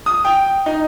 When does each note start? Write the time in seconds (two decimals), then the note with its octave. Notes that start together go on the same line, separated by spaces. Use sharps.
0.06 D#6
0.25 G5
0.66 D#4